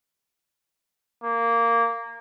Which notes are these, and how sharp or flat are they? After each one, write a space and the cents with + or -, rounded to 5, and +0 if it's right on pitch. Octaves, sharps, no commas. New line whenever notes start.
A#3 -10